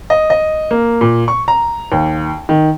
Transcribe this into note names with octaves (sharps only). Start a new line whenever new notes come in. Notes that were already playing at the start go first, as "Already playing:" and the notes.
D#5
D#5
A#3
A#2
C#6
A#5
D#2
D#3